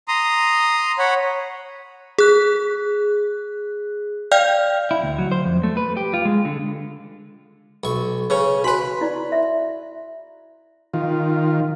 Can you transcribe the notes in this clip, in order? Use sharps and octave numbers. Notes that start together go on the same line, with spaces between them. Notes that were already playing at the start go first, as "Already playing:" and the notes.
A#5 C6 D#6
C#5 F#5 B5
G#4 F#6
D5 F5 G5 F6 G6
E4
D2
F#3
C5
F2
A3
B4
G4
F4
G#3
D3
B1 C#6
C#3 C#4 B4 C#5
F#4 B4 G#5 B5 C6
E4 D5
E5
D#3 F4